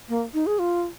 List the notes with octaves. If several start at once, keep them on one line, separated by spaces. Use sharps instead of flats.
A#3
D#4
G#4
F4